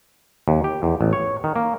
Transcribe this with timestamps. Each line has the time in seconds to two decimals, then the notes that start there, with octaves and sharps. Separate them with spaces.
0.48 D#2
0.64 G4
0.83 E2
1.01 A1
1.13 C#5
1.44 D#3
1.56 A#3